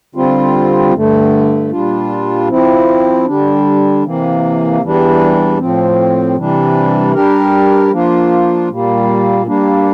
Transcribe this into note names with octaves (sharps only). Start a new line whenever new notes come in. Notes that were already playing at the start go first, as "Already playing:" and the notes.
D3 G3 C4 F4
G2 D3 A3
A#2 G3 D4 F4
F3 C4 E4
D3 G3 D4
C3 E3 A#3
E2 E3 G3 D4
A2 F3 C4
C3 E3 G3 D4
G3 D4 G4 A#4
F3 A#3 D4 F4
A#2 G3 A#3
G3 A#3 D4